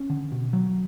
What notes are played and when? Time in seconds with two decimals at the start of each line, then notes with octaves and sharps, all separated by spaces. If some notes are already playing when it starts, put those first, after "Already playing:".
Already playing: C#4
0.10 D3
0.32 B2
0.53 F#3